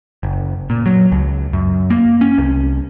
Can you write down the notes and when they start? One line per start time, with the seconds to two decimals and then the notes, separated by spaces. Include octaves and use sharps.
0.23 F#1
0.70 A#2
0.86 F#3
1.12 C#2
1.53 F#2
1.90 A#3
2.21 C#4
2.38 C2